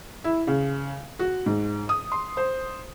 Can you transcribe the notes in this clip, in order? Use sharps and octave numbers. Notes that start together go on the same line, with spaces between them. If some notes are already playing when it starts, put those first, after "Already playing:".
E4
C#3
F#4
G#2
D#6
C6
C5